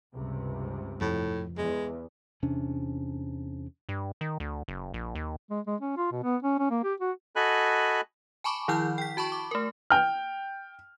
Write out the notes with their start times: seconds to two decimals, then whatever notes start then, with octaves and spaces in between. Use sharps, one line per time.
0.14 C#2 G2 C3
1.01 F2 A2
1.58 E2 G#3
2.43 E2 C3 C#4 D4
3.89 G2
4.21 D#3
4.40 D2
4.68 F#1
4.94 A#1
5.15 D#2
5.50 G#3
5.67 G#3
5.81 C#4
5.97 F4
6.12 B2
6.23 B3
6.43 C#4
6.59 C#4
6.71 A#3
6.84 G4
7.00 F#4
7.36 F#4 A4 D#5 G#5 B5 F#6
8.44 G#5 A5 B5 C#6 D6
8.68 D#3 F3 E4 F6 G6
8.98 G5 B6
9.17 F#4 A5 B5 C#6
9.32 D6
9.51 A3 A#4
9.90 G5 F6